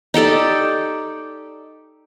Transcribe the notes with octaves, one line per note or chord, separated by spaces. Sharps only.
D#4 G4 A4 D5